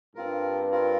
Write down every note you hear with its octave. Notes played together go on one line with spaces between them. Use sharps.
G2 C4 F4 A#4
C4 F4 A#4